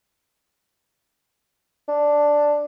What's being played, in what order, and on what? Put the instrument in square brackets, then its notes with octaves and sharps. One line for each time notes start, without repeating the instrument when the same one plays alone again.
[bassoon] D4